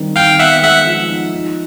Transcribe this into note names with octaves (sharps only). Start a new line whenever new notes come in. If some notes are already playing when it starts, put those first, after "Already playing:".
Already playing: D#3 G3 C4
D#3 F5 G5
B3 E5 F#5
G#3 E5 F#5
F3
D#4
D#4